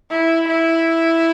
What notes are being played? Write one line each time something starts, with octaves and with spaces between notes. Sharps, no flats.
E4
E4